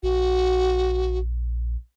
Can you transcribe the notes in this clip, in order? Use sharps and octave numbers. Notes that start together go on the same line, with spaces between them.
A#1 F#4